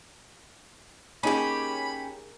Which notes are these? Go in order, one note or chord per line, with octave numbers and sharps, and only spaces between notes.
A#3 C#4 D#4 G4 G#4 B5